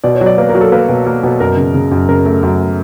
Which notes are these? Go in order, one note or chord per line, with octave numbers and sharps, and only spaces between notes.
B2 D5
C#5
F#3
D5
A#3 B4
A#4
F#3
A4
A#3 B4
B2
A#3
B2
F#2 A#4
C#3
C#3
F#2
C#3 A#4
A3
F#2
A3